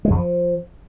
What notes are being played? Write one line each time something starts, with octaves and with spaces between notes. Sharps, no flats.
G#3
F2
F3